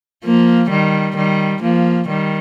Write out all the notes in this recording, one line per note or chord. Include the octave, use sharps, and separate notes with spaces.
F3 A#3
D#3 G3
D#3 G3
F3 A#3
D#3 G3